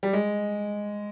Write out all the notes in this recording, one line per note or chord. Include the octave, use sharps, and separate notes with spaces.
G3
G#3